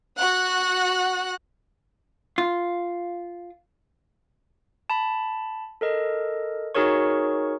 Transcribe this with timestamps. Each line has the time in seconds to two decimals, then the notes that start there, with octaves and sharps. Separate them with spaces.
0.18 F#4 F#5 F#6
2.38 F4
4.90 A5 B5
5.81 A4 A#4 D#5
6.75 D#4 F#4 G#4 A#4 C#5 C#6